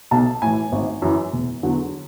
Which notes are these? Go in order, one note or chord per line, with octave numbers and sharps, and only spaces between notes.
B1 A5
A2 E3 G#5
G#1
F#2 E3
E1
E2 D3 F#3